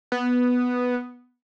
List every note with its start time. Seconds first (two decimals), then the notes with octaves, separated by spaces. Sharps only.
0.12 B3